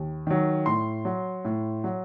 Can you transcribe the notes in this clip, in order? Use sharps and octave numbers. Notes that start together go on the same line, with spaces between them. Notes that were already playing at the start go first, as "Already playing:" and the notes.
Already playing: D#2
D#3 F#3
A2 C6
F#3
A2
F#3